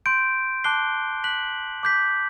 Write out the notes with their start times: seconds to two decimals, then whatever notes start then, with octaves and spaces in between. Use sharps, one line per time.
0.06 C6 G6 D7
0.64 A5 D6 F#6 C7 G7
1.24 F#6 B6 F#7
1.83 D6 G6 B6